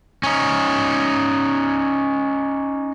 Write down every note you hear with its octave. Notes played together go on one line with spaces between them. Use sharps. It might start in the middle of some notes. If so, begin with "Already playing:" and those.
C#4 D#4